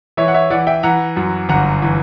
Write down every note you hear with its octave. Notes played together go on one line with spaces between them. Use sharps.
E3 C#5 E5
F#5
C#5 E5
E3 D5 F#5
E5 G5
E3 F#5 A#5
F#2
G1 F#5 A#5
E3